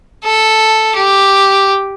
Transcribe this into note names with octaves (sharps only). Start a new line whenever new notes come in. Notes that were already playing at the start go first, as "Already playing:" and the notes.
A4
G4